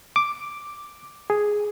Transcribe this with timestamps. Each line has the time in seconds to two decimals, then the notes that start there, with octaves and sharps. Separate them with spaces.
0.16 D6
1.30 G#4